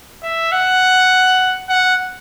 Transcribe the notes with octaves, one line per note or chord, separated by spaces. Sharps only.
E5
F#5
F#5